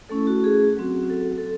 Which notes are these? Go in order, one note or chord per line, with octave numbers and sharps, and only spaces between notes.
A3 C#4 E4 A4
F#4
G#4
F#3 C4 F#4
A4
A4